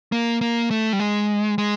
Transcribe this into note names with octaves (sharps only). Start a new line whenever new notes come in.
A#3
A#3
A3
G3
G#3
G#3